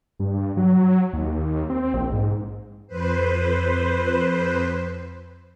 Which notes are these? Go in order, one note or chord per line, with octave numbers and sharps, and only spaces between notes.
G2
F#3
D#2
C4
A#1
G#2
F2 B4 C5